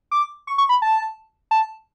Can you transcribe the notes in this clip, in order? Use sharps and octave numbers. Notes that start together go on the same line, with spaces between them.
D6
C#6
C#6
B5
A5
A5